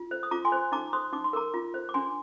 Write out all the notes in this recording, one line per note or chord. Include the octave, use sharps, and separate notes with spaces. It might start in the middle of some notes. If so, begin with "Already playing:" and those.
Already playing: F4
C5
D#6
F4 A#5 D6
G#5 C6
C5
D#4 A#5 D6
C5 C6 D#6
D#4 D6
C6
A#4 A#5 D6
F4
C5
D6
D4 G#5 C6